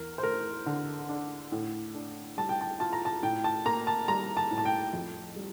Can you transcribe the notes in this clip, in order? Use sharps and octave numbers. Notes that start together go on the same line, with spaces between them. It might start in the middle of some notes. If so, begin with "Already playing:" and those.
Already playing: E2 A#4
C5
A3 A#4
D3
D4
A2
D4
G3 A5
G5
A5
F4 A5
A#5
A5
A2 G5
A5
A#3 A#5
A5
G3 A#5
A5
A2
A5
G5
F2
G3